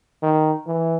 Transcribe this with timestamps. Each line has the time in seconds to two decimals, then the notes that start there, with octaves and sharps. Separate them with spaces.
0.23 D#3
0.67 E3